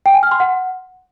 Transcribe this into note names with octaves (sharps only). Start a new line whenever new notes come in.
G5
G#5
F6
C6
F#5